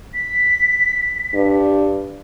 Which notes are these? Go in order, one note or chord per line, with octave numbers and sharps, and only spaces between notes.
B6
G2